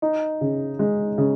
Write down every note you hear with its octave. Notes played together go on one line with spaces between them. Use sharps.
D#4
C#3
G#3
C#3